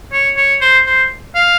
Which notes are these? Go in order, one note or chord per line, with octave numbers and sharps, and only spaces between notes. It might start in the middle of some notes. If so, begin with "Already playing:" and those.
C#5
C#5
C5
C5
F5